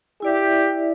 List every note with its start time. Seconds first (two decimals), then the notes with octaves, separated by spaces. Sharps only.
0.22 E4 G4 D5 E5